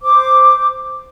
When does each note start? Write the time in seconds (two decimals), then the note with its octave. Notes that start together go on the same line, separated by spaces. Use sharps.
0.01 C5 D6